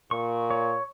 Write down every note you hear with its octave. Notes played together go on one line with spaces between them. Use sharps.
A#2 C#6
C#5